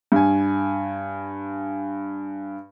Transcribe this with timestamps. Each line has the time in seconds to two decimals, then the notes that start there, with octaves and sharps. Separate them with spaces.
0.12 G2 G#5